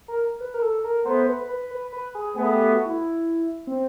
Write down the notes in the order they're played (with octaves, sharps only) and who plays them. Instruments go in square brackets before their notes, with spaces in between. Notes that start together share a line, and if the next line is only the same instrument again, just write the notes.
[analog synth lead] A#4
B4
A#4
A4
A#4
[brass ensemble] A3 B3 [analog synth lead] C5
[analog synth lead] B4
B4
B4
B4
G#4
[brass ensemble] A3 B3 [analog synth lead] G#4
[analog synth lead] G4
F#4
E4
C4